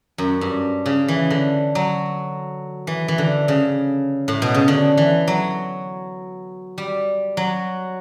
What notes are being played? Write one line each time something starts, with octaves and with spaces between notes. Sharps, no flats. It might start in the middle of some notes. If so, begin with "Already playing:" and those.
F#2
G2
C#3
E3
D3
F#3
E3
E3
D3
C#3
A2
B2
C#3
D3
E3
F#3
G3
F#3